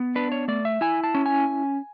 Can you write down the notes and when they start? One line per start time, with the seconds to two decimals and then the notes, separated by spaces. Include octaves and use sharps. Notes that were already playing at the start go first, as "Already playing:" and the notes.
Already playing: B3
0.15 D4 B4
0.32 C#5
0.48 A3 D5
0.65 E5
0.81 E4 G#5
1.04 A5
1.14 C#4
1.26 G#5